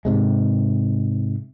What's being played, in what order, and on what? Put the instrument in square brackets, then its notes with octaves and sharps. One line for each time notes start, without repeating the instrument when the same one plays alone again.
[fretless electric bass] G#2 C3 G#3